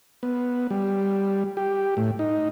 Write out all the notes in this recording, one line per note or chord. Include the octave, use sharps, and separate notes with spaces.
B3
G3
G4
A2
D#4